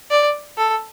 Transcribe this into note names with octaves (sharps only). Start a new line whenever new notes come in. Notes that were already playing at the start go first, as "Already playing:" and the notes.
D5
A4